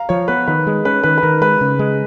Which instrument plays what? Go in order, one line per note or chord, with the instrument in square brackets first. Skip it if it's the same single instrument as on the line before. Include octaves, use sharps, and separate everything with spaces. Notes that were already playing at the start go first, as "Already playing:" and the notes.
Already playing: [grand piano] F5 A#5
[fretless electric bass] F3 [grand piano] C#5
[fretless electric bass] B3 [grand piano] B4
[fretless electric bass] D#3 [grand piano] B4
[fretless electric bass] G#3
[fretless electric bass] C#4 [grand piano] B4
[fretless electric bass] D#3 [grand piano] B4
[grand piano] B4
[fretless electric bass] D#3 [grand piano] A#4
[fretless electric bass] G#3 [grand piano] B4
[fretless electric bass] C#3
G#3